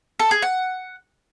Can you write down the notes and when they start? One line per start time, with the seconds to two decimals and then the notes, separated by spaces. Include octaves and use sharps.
0.19 A4
0.31 G#4
0.42 F#5